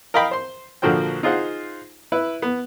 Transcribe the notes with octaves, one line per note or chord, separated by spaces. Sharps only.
A#4 D#5 F5 G5 B5
C5 C6
A#1 D3 F3 F#4 C5 G5
D#4 F4 G#4 C5 F#5
E4 B4
B3